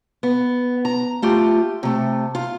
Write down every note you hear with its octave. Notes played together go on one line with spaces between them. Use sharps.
B3
A#5
A3 F4 G4
C3 A3
F4